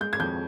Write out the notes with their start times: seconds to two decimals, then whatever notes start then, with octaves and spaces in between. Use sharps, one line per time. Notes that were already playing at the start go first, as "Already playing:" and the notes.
0.01 G#3 G6
0.13 G#6
0.20 F2 G6